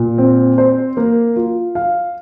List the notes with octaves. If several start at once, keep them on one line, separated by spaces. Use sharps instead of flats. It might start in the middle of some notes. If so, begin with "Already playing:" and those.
Already playing: A#2
C4
C5
A#3
F4
F5